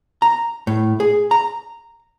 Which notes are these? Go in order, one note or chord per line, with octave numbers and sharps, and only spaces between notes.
A#5
A2
G#4
A#5